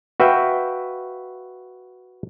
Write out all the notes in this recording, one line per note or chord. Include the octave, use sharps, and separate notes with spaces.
F#4 B4 E5 F5 G5